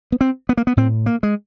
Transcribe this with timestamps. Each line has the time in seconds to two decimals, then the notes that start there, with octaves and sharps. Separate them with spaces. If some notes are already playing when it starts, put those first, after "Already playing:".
0.12 B3
0.21 C4
0.49 B3
0.57 A#3
0.67 B3
0.77 A2 C4
1.06 A#3
1.23 G#3